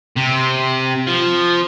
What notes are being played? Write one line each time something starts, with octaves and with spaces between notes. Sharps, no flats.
C3
F3